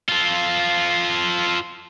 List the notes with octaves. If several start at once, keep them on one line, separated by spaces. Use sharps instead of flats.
F4 A4